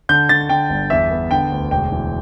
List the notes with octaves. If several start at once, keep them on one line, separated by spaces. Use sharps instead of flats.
D3 G6
D3 A6
D3 G5
G1
E2 E5
B3
D3 G5
D2
E1 G5
E3